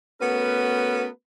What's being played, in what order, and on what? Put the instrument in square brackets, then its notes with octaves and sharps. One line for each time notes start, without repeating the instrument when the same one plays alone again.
[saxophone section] A3 B3 C#4 F#4 A#4 B4